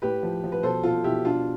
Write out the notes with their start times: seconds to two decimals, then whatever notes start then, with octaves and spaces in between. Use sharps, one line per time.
0.02 A2 G4 B4
0.23 F3
0.44 F3
0.52 B4
0.63 B2 A4 C5
0.83 B2 F4 A4
1.04 B2 E4 G4
1.25 B2 D4 F4